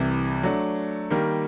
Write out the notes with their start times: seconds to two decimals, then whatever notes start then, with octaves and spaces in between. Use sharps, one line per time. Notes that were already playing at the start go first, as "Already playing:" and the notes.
Already playing: C2 C3 E3
0.43 F#3 A3 D4
1.10 D#3 G3 A#3